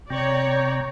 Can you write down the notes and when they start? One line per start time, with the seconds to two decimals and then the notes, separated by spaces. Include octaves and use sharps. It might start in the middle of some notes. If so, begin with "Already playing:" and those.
0.10 C3 C#5 D5 G5 A#5